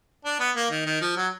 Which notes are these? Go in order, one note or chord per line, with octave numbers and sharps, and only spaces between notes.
D4
B3
A#3
D#3
D#3
F3
F#3